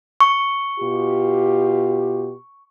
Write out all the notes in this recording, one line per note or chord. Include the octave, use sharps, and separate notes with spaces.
C#6
B2 F4 G4